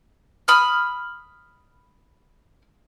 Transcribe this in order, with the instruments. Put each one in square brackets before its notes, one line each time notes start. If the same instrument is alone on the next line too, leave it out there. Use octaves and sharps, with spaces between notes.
[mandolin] B5 D#6 F6